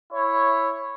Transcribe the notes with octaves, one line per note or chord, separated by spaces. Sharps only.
E4 C#5